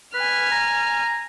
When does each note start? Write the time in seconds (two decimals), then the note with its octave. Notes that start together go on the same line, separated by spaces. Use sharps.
0.14 B4 G#5 F6
0.52 A#5